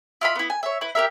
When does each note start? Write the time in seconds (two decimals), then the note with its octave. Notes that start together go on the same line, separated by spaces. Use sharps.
0.21 E4 F4 D#5 B5
0.35 B3 E4
0.50 G#5
0.63 C#5 E5
0.81 E4 B4
0.95 G4 G#4 A#4 E5